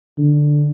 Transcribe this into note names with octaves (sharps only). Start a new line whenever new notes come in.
D3